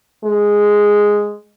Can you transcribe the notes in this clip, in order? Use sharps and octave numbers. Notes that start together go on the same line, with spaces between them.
G#3